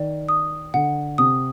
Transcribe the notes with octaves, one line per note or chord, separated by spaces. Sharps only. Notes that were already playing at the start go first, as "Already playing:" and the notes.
Already playing: D#3 D5
D#6
D3 F#5
C3 D#6